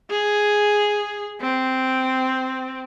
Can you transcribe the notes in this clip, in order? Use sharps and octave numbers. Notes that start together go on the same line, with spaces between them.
G#4
C4